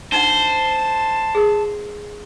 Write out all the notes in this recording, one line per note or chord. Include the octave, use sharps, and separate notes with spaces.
D4 D#4 C5 F#5 A5
G#4 A#4